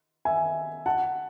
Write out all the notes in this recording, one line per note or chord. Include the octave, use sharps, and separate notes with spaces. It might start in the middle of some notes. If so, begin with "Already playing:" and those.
E5 G#5
F#5 A5